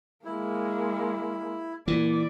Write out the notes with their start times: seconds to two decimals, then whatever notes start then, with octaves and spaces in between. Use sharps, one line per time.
0.25 G#3 A#3 E4
1.88 A#2 E3 D5